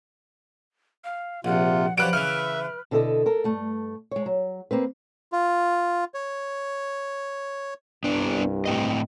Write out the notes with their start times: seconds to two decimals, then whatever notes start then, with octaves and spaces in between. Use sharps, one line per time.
1.04 F5
1.44 A#1 C3 F4 F#5
1.98 F3 F#3 G4 B4 D5 F#6 D7
2.13 C#3 E3 E5 F6
2.91 B2 D3 E4 G4 A4 D#5
3.26 A4 A#4
3.44 G2 A3
4.11 G#3 C#5
4.26 F#3
4.71 A#3 C4 B4
5.32 F4
6.14 C#5
8.04 C2 G2 B3 D4
8.66 A2 C4 D#5